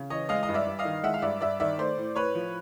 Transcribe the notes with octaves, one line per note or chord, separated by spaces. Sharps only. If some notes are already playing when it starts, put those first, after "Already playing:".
Already playing: C#3
E3 C#5 D#5
G#3 D#5 F5
D#5
G2
D5 E5
G2
D#5 F5
D#3
G#3 E5 F#5
F5
G2 D5 E5
G2 D5 E5
D#3 D5 E5
A3 C5 D5
A2
A2 B4 C#5
F3